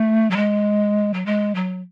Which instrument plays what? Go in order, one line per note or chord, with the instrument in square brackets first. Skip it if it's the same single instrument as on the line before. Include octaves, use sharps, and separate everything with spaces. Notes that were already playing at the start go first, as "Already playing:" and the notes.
Already playing: [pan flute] A3
F#3
G#3
F#3
G#3
F#3